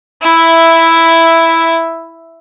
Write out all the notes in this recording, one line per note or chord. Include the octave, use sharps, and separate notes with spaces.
E4 E5